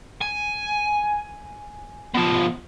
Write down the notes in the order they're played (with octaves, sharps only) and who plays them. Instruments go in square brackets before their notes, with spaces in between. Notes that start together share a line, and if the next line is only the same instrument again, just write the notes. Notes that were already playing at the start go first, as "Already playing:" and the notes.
[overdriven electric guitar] G#5
B2 F3